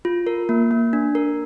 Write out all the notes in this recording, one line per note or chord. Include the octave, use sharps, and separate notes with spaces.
F4
A#4
A#3
A#3
D4
A#4